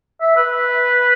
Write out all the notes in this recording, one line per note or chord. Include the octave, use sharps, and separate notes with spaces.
E5
B4